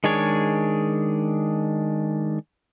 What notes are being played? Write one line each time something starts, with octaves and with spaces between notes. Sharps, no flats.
D#3 G#3 D4 G#4 C#5